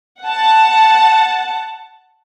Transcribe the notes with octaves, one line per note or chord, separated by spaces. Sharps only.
F#5 A5